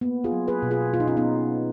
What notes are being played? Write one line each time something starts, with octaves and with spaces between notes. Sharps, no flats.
A#3 B3
F4 G#4
F#3
G#4 B4
B2
F4 G#4
B2 F4
D#4
C#4 F4
B3 D#4